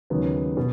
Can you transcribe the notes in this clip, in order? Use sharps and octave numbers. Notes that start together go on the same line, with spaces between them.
D#2 C#3 F#3 B3 D#4
B2